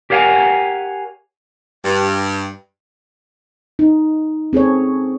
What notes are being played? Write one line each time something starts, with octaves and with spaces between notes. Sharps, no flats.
G4 A#4 C#5 F5 F#5 G#5
G2
D#4
C4 G#4 A4 C#5